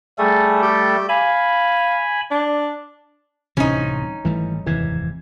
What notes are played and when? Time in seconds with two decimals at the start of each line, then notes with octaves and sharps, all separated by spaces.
0.18 G3 A3 G#4 A4
0.62 G4
1.09 F5 G#5 B5
2.31 D4
3.57 D1 C2 C3 E3 C#4 D#4
4.25 G#1 E3 G3 A3
4.66 F1 D#2 G#2 C3 E3 G#6